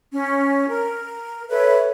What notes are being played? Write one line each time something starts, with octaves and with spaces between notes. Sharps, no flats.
C#4
A#4
A4 B4 C#5 E5